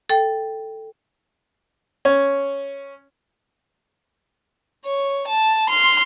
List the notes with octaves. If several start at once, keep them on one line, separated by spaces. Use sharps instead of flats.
A4 G5
C#4 C#5
C#5
A5
C6 F6